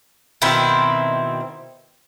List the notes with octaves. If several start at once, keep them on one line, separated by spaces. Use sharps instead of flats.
B2 D#3 C4 E4